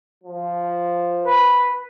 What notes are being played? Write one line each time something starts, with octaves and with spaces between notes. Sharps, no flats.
F3
B4